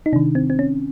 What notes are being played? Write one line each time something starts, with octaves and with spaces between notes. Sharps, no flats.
D#4
C3 D#3 D4
C4
C4
C#4